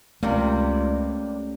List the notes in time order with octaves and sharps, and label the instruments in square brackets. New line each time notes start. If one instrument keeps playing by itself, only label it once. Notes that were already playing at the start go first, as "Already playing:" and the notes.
[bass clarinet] C#2 [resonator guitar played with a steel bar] C3 G3 A#3 [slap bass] A3 C#4